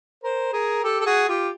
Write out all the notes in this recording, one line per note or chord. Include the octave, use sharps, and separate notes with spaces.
A#4 C5
G#4 A#4
G4 A4
A4
F#4 G#4
F4 G4